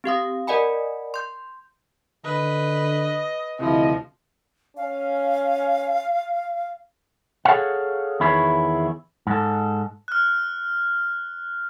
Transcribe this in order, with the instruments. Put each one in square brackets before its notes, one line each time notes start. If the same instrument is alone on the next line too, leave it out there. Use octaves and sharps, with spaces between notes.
[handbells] C4 G4 F5 D#6
A#4 D5 D#5 F#5 G#5 B5
C6 G6
[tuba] D3 [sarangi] B4 [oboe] D#5
[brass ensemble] D2 E4 D#5 [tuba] C3 [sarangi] F3
[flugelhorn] C#4 [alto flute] F5
[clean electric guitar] G#4 A4 C5 C#5 F5 F#5
E2 D#3 E4 G#4 B4 C#5
G#2 A4
[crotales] F6 F#6